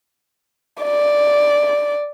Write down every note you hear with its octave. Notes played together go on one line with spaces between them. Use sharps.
D5